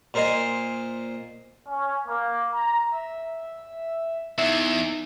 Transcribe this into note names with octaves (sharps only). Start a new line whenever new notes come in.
A#2 A#4 C5 D#5 G#5
C#4
A#3
A#5
E5
E2 D#4 E5